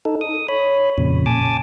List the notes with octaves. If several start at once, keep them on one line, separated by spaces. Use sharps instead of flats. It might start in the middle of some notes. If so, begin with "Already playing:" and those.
D#4 A4
D#6
C#5 B5
F2 A#2 C#3
G#5 A5 D6